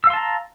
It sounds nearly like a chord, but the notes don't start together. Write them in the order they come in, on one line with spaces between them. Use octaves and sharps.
E6 F5 C6 A5 A#5